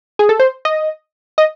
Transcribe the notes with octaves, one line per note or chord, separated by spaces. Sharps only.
G#4
A4
C5
D#5
D#5